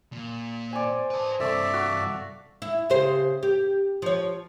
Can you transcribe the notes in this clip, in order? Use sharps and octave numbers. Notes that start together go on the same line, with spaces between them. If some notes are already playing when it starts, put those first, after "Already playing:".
A#2
C5 D5 G#5
B4 A5
G2 C3 A4 D5 E5 C#6
F#4 F5
E4
C#3 G4 C5
G4
F3 C#5